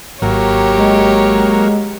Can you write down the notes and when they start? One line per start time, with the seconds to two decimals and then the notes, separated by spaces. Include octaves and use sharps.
0.22 G#1 F#3 A#3 G4 C#5
0.78 G#3